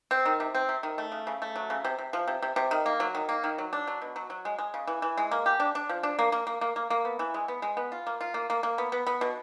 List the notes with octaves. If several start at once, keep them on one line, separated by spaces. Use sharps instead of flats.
C4
D#3
C3
C4
C3
D#3
A3
C#3
C#3
A3
F#3
C#3
C3
C3
F3
C3
C3
C3
D#3
A#3
F#3
D#3
A#3
D#3
F#3
D4
F#3
B2
F#3
F#3
G#3
G#3
C#3
E3
E3
G#3
A#3
G4
D4
D4
F3
D4
A#3
A#3
A#3
A#3
A#3
A#3
B3
E3
G#3
B3
G#3
B3
F4
A#3
F4
A#3
A#3
A#3
B3
B3
B3
B2